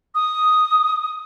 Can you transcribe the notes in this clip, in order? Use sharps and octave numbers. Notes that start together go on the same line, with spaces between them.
D#6